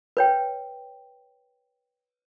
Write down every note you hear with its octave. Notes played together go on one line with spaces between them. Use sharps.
B4 C#5 G5